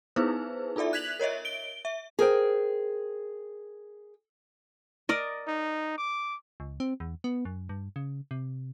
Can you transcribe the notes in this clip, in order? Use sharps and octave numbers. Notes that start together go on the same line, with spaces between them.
B3 D#4 E4 G#4 B4 C5
D#4 F4 A4 D5 E5
F#6 G#6 B6 F7 F#7
A#4 C#5 D#5 E5
D7 G7
E5
G#4 A#4 C5 G5
A#4 D5 D#5
D#4
D6
C#2
C4
E2
B3
F#2
G2
C#3
C3